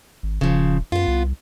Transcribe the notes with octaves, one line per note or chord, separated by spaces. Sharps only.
G#1
D#1 C#3 F3
F#2 B3 F4
C2